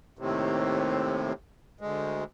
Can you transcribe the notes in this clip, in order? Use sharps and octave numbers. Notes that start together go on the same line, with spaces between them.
D#2 A2 C3
D2 G#3